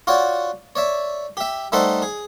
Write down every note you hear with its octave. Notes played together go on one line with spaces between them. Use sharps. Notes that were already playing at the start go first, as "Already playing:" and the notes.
F4 F#4 C#5 D5 F#5
C#5 D5 E5
G4 E5
G3 A3 D#4 A4 C5 F#5
G#4